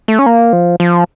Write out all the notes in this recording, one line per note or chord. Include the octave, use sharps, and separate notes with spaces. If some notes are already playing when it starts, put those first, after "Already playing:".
A3
C#4
A#3
F3
F3